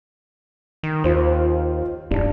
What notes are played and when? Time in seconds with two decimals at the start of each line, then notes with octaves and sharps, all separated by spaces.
0.83 D#3
1.04 D#2 F4 C5
2.11 E1 G2 D4